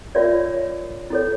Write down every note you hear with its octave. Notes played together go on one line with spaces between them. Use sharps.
F4 A#4 C#5 D5 E5
E4 A4 C#5